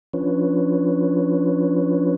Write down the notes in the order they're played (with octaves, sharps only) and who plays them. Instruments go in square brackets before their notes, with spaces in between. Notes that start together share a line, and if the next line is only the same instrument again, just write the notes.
[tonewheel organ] F3 C#4 D4 F4 B4 C#5